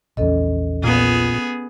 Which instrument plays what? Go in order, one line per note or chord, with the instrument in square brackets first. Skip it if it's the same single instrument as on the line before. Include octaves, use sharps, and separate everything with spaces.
[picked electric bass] A#1 E2 [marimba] C#4 A4 D#5
[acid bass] A#2 [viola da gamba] B3 G#4